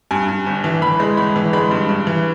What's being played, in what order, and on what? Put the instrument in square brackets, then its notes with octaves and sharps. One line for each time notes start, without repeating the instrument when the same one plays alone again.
[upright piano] G2 G#5
G2
G1
E3
E3 B5
G#3
G1 B5
E3
G#3 B5
G2
G2
E3